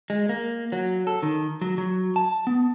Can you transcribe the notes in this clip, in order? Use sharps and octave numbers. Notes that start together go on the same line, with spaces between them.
G#3
A#3
F#3
A4
D#3
F#3
F#3
A5
B3